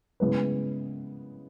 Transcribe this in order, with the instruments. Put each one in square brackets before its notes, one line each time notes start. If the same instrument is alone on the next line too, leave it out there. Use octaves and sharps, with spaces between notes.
[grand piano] C#3 G#3 B3 E4 B4